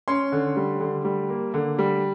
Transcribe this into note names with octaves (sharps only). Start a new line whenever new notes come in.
C#4 C6
D3
G3
D3
G3
A#3
D3
G3